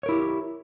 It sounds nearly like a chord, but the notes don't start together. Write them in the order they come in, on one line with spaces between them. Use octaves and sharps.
C#5 A#4 E4 G4